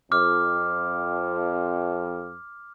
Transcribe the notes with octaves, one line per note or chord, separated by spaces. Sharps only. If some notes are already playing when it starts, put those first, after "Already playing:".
F2 D6 F6